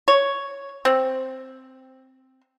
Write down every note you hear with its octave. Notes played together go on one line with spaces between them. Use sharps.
C#5
C4